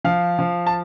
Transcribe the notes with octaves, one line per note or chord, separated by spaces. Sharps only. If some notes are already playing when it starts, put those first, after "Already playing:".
F3 F5
F3
A5